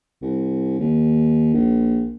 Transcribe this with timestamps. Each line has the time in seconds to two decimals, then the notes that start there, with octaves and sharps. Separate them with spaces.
0.22 C2
0.79 D#2
1.54 A#1